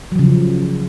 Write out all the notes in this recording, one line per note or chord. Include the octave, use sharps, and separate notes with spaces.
C#3 F3 F#3